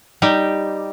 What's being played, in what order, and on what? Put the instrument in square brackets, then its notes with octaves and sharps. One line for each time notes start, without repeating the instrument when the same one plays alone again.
[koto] G3 D#4 G4